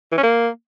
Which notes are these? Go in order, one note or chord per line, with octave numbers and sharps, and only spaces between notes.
E3
C#4
A#3